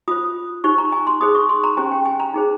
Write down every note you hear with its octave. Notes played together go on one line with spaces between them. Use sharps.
F4 C5 D#6
D#4 G4 C5 C#6
A#5
G#5
C6
D#4 G#4 C5 D#6
C#6
C6
A#5
C#4 G4 C5 G#5
G5
G#5
A#5
D#4 G#4 C5